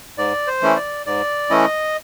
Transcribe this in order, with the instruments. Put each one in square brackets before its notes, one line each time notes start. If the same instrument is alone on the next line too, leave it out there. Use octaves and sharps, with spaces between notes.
[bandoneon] G#2 D5
C5
E3 A3 C#4 E4
D5
G#2 D5
E3 A3 C#4 E4 D#5